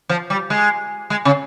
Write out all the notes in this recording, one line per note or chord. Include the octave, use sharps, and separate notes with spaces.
F3
G3
G#3
G#3
C#3